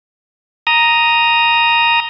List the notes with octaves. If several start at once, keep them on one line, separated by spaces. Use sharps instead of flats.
A#5 D#6